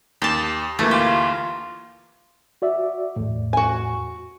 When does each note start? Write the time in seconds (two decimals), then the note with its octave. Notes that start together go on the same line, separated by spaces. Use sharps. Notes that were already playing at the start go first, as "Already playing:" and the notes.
0.22 D#2 G4 A5
0.79 D2 E3 A3 A#3
0.91 F4 G4
2.62 F#4 D5 E5
3.16 E2 A2
3.53 F#4 G#5